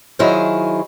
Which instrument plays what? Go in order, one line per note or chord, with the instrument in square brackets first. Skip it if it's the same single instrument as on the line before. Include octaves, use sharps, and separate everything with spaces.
[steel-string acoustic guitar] D#3 F#3 E4 F4 G#4 C5